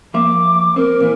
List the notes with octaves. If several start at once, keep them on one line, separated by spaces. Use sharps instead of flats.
F3 A#3 E5 D6
C4 A#4
A#2 E3